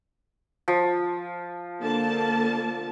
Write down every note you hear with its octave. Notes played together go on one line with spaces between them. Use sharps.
F3
D3 A#3 A5